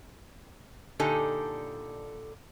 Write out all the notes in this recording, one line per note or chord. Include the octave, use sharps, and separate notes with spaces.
A#2 D3 D#4 G4 A4 G#5